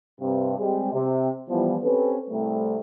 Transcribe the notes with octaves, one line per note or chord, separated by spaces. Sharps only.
G2 C3
G3 G#3 C4 G4
C3
E3 F3 G3 B3
C4 C#4 G4 A4 B4
C2 A2 C3 G3 A3